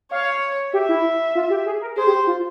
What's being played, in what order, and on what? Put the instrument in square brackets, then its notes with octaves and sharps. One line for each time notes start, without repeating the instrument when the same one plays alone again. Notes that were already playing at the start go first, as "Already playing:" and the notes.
[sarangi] C#5 [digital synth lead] F5
[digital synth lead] G4 [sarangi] E5
[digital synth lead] E4
F4
G4
G#4
A#4
[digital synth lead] G#4 [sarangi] C5
[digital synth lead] G4
F4